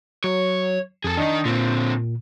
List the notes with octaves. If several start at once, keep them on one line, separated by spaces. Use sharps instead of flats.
F#3 C#5
F2 G#4 A4
D#3 D4 D#4 D#5
A#2 D3 C4